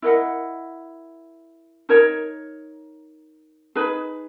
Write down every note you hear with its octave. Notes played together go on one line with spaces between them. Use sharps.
E4 A#4 D#5 F#5
D#4 A#4 C#5
D#4 G#4 B4